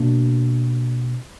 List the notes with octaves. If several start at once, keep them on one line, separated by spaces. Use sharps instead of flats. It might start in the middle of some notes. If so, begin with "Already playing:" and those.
Already playing: B2 A#3 D4